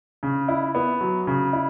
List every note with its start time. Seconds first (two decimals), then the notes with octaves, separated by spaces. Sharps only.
0.23 C#3
0.48 E4
0.75 B3
1.00 F#3
1.27 C#3
1.53 E4